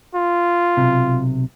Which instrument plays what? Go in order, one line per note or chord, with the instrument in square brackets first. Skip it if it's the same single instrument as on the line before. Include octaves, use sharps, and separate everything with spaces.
[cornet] F4
[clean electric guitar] B1 C3